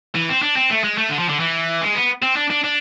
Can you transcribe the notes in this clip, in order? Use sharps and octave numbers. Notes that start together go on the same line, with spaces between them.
E3
C4
D4
C4
A3
G#3
A3
D3
F3
D3
E3
G#3
B3
C4
D4
D4
D4